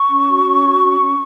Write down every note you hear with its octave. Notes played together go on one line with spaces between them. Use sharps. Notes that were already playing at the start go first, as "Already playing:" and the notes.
Already playing: C#6
C#4
F#4
C#4
F#4
C#4
C#4